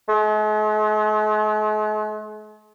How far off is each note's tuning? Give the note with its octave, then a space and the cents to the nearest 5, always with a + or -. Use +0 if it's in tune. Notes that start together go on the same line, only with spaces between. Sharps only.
G#3 +45